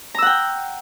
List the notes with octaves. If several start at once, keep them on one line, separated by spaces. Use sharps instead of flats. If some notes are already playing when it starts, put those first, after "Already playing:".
F#5 G5 A#5 E6